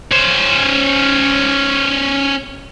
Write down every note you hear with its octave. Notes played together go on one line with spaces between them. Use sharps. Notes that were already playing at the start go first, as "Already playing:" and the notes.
C#4 C5